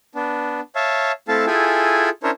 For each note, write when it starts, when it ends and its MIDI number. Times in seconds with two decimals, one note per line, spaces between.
0.15 0.60 59
0.15 0.60 62
0.76 1.12 73
0.76 1.12 76
0.76 1.12 77
0.76 1.12 81
1.28 1.46 57
1.28 1.46 60
1.28 1.46 64
1.28 1.46 69
1.28 1.46 77
1.28 1.46 81
1.47 2.09 64
1.47 2.09 65
1.47 2.09 68
1.47 2.09 69
1.47 2.09 79
1.47 2.09 80
2.23 2.31 61
2.23 2.31 62
2.23 2.31 64
2.23 2.31 70
2.23 2.31 72
2.23 2.31 73